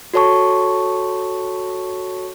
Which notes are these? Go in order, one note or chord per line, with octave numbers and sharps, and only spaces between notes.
F#4 A4 C#5 A5 C#6